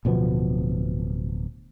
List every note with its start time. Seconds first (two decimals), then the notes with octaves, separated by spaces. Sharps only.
0.05 D1 B2 F3 B3